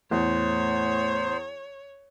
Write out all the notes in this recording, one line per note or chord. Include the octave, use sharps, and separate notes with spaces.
E2 A2 C5 C#5